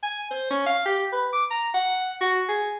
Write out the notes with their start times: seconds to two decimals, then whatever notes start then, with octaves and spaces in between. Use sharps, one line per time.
0.03 G#5
0.30 C5
0.51 C#4
0.66 F5
0.85 G4
1.12 B4
1.33 D6
1.51 A#5
1.74 F#5
2.21 F#4
2.49 G#4